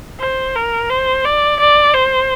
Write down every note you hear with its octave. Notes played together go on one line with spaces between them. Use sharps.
C5
A#4
C5
D5
D5
C5